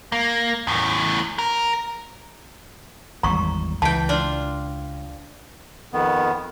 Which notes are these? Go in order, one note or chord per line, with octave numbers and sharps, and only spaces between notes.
A#3
E2 A2
A#4
G#1 E2 G3 A#5 C#6
C#2 E3 G5 A5
D4 F4
F2 D#3 B3